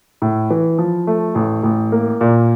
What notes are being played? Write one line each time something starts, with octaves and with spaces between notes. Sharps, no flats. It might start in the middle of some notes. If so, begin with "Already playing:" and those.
A2
E3
F3
A3
A1
A1
A#3
A#2